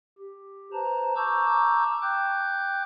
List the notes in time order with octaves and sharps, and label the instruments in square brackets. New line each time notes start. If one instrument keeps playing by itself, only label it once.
[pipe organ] G4
B4 C5 A5 A#5
A5 A#5 C#6 D6 E6 G6
G5 D6 F#6 G6